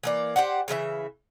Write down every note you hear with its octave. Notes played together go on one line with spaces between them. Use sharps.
E3 A#3 D5
G4 C5 D5 F#5
C#3 E3 A4 E5